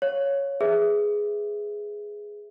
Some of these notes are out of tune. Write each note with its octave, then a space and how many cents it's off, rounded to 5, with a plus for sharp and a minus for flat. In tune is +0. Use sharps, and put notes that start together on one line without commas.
C#5 +0 F5 +0
G#4 +0 B4 +20 E5 +0